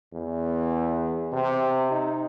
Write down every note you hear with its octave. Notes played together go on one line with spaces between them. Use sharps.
E2
C3
D#4